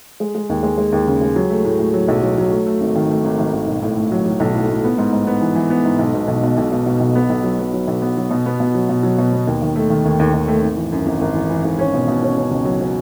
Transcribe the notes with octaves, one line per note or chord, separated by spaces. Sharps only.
G#3
G#3
D#2
G#3
G#3
D#2
C#3
G#3
F#3
A3
A2
A2
F#3
B1
F#3
F#3
A3
A3
G#1
D#3
A3
G#1
D#3
G#1
B1
A2
A3
F#3
F#3
B1
A2
A2
B3
G#2
G#2
B3
E3
E3
B3
G#2
B1
B2
B1
B2
B1
B2
B2
B1
B3
B1
F#3
B3
F#3
B1
B3
F#3
B2
B3
B2
F#3
B2
F#3
B2
B3
D#2
D#3
A3
D#3
D#2
D#2
D#2
A3
G#1
E3
F#2
G#1
G#1
E3
E3
G#1
C#4
B2
B2
C#4
C#4
C#2
F#3
C#4